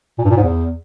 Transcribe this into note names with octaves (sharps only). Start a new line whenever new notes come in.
A#2
G2
A#2
G#2
E2